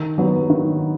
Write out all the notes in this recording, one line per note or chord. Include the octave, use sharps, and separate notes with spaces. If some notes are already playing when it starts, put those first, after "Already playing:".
Already playing: D#3
F#3 B3
D#3